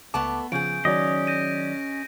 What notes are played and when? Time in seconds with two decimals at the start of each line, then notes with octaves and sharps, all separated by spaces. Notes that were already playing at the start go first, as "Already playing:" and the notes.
0.14 C#2 A3 B3 A5 D6
0.52 C#3 F3 G#4 G6 D7
0.85 D#3 F#3 C#4 D5 D#5
1.27 G6 A#6 D#7